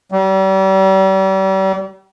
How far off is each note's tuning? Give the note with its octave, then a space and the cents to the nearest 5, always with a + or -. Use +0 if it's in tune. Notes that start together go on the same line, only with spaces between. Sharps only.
G3 -40